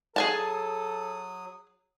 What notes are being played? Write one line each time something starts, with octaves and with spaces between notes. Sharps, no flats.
F#3 G#4 A4 G#5 A5 D#6